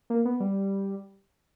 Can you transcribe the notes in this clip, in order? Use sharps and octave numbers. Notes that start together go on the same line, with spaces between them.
A#3
B3
G3